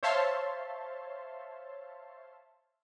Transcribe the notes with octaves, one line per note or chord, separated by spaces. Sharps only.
C5 C#5 E5 F5 A5 C6